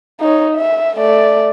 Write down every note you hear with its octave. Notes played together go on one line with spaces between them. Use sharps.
D#4 C#5
E5
A3 D5